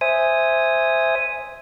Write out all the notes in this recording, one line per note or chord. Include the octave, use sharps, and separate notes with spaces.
C5 E5 G#5 D#6